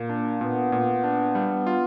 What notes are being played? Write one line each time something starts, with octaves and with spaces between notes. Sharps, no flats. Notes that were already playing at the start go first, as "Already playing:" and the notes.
Already playing: A#2 A#3
D4
A#2 B3
A#2
D4
G3
F4